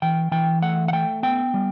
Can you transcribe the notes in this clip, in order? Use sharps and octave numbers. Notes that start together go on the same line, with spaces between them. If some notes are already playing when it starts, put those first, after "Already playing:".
E3 G5
E3 G5
A3 F#5
F#5
A3 G5
B3 G5
G3